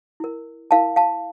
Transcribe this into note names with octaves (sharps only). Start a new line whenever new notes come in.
E4 A#4
E4 A#4 F5 A5
F5 A5